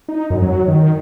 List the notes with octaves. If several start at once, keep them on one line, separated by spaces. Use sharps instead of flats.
D#4
F#2
F#3
D#3